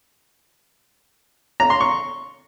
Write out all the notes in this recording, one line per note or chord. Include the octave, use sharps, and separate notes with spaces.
A#5
C6
C#6